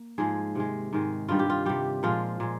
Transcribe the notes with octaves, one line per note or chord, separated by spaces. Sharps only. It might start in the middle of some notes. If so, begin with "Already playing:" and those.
Already playing: A#3
G#2 F3 G#3 G#4
C3 D#3 G#3
G#2 D#3 G#3
G2 D#3 G3 F4
G4
F4
C3 G3 G4
A#2 F3 G#3 F4
A#2 G#3